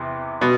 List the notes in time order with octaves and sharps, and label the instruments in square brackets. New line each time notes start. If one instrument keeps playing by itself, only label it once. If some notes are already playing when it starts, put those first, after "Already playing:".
Already playing: [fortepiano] E2 C3
B2